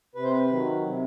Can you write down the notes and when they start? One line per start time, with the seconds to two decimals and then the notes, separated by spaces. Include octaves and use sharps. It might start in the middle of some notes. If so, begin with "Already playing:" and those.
0.15 C3 B4
0.24 C5
0.32 B4
0.49 D#3 F#3
0.83 C3